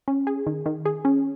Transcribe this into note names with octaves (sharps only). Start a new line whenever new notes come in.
C#4
G#4
D#3
D#3
G#4
C#4